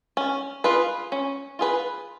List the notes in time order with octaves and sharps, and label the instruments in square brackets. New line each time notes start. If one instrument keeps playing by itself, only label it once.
[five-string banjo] C#4
F4 G#4 B4
C#4
F4 G#4 B4